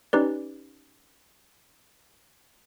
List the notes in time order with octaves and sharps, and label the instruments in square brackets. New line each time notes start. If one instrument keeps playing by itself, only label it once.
[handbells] C#4 D#4 G4 B4 D5